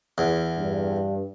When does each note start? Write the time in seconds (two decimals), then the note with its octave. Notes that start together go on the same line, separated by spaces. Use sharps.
0.18 E2
0.58 G2